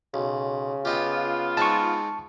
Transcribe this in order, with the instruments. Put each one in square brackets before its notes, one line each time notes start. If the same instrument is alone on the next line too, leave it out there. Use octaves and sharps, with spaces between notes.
[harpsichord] B1 [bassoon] C#3
[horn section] B3 F4 [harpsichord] G4 D#5 G5
[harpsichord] G#3 C4 D#4 [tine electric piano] A5 C#6